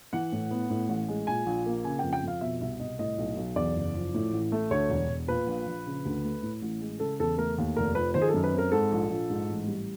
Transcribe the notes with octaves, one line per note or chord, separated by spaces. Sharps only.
E3 F#5
A2
B3
A2
A1
G#3
A#2 G#5
A#1
A#3
C#3 G#5
F2 G5
G5
F2 F5
B2 E5
C2 E5
C2 D#5
A2 D#5
B1
B1
E2 D5
F#1
F3
A2
A1
A3
D2 C#5
E1
E1
A#2 B4
A#1
A#1
C#3
D2
A3
A2
A1
G#3
C#3 A4
E2 A4
A3 A#4
D#2
F1 A#4
F3 B4
D#3 C5
G#4
A4
F#2
B4
C4 A#4
G#2 A4
A#1
A#1
G#2
A1
G3